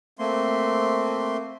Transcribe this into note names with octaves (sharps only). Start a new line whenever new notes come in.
A3 A#3 C4 C6